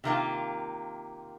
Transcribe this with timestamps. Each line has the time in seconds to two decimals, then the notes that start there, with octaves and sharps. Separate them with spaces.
0.04 C3 D#3 A#3 F4